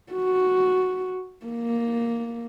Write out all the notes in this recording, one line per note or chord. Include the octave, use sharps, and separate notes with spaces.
F#4
A#3